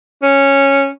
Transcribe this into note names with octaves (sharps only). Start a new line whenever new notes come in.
C#4